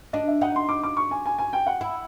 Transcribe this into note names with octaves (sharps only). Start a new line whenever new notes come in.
D4 D#5
E5
D#4 F#5
C6
D6
D6
C#6
G#5
G#5
G#5
G5
F#5
E4